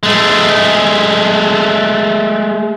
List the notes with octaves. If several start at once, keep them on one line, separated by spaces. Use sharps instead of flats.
G#3 A3